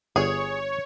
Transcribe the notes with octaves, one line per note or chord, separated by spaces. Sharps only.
G1 G#4 C#5